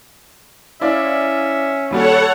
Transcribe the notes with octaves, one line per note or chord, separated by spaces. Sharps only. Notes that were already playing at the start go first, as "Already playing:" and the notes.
C#4 E4 D5 E5 F5
D#2 G3 F#4 A4 C#5 F#5